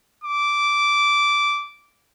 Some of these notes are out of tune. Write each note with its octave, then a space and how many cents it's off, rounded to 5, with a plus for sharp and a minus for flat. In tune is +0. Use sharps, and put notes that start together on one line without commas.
D6 -10